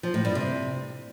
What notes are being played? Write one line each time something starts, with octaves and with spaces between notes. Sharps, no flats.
F3
A2
G2
C3